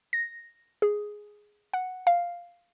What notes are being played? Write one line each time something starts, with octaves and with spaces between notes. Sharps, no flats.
A#6
G#4
F#5
F5